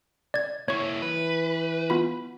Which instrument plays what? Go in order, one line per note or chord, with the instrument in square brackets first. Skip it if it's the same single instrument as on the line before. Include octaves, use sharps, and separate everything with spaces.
[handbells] D5 G#6
[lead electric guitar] A#3 E4 [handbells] C#5 C#6
[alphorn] E3 [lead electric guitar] B4
[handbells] B3 F4 B5